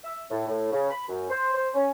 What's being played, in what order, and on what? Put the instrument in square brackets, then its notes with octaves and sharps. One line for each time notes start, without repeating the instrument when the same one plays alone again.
[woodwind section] E5
A2
A2
C#3
B5
F#2
C5
C5
C#4